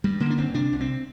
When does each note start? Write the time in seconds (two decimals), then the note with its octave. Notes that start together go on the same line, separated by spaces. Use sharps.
0.04 G2 G3
0.20 D3 A#3
0.30 D4
0.38 G1 C4
0.54 C3 D4
0.73 C2
0.81 C4